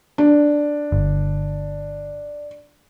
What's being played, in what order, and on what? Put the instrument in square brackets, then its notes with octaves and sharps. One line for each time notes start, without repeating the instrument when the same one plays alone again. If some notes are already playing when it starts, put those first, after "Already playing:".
[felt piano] D4
[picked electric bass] G1